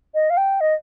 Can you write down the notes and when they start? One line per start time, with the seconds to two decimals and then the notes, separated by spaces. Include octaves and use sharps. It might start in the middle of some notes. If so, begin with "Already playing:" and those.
0.14 D#5
0.30 F5
0.37 G5
0.61 D#5